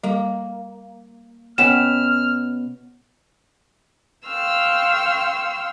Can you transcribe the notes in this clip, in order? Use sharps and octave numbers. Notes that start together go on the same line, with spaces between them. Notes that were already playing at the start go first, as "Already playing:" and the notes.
G3 A#3
B2 B3 C#4 G5 F6 E7
F5 G5 C6 C#6 E6 F6